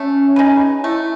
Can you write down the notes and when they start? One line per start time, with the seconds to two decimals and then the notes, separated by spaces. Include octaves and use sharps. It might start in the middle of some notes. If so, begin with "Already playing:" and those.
Already playing: A3 C#4
0.36 D#4 G#4 B4
0.84 A3 E4